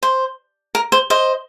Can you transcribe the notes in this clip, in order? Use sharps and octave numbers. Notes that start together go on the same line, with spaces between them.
C5
A#4
C5
C5 D#5